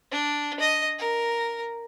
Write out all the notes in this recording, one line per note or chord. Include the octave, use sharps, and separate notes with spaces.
D4
D#5
A#4